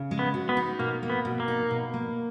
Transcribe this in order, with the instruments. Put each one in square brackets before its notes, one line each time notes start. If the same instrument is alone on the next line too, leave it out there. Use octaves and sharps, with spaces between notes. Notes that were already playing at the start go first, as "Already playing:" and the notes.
Already playing: [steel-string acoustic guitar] C#3
G#3
[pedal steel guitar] B3
[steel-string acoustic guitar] F#4
[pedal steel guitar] B3
[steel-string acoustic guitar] D#4
[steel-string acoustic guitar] B2 [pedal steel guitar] A#3
[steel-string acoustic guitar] A#3
[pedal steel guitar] B3
[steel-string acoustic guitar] B2
[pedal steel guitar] A#3
[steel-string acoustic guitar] D#4
B2
A#3